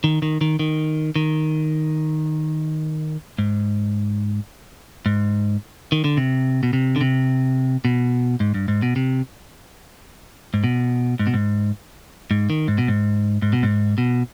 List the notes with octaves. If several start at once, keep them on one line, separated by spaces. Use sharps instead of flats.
D#3
D#3
D#3
D#3
D#3
G#2
G#2
D#3
D3
C3
B2
C3
D3
C3
B2
G#2
G2
G#2
B2
C3
G#2
B2
G#2
B2
G#2
G#2
D#3
G#2
B2
G#2
G#2
B2
G#2
B2